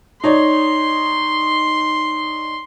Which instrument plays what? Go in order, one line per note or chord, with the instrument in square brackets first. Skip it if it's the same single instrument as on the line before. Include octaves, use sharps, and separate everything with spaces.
[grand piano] D#4 C#5 D5 [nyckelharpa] C6